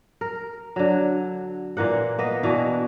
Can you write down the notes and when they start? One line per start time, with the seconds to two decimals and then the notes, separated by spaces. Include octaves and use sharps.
0.21 A#4
0.76 D3 F#3
1.77 A#2 E3 A#3 F#5
2.18 A#3 B3 D#5
2.43 B2 E3 D4